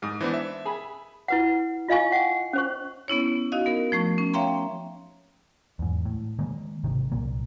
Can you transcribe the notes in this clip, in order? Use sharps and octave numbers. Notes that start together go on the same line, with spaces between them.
G#2 D#6
E3 B3 D4 C5
E5
G#4 B5
E4 B4 F#5
F4 D#5 F5 G#5 C#6
F#5 G5
C#4 C5 C#6
B3 C#4 E4 C#5
D#4 F#4 D#5 F5
B3 A#4
F3 A3 C#6
C#4
C#5 E5 F5 G5 A#5 C6
E2 G#2
A2
D#3 G#3 A#3
G#1 C3 D#3
C2 A#2 A#3